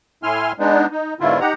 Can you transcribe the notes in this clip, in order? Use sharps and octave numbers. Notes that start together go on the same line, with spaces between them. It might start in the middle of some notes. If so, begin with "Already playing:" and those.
A2 E4 G#5 C6 F6
G#3 B3 D4 D#4
D#4
G#2 B2 D3 E4 F4
D#4 G4 F#5 A#5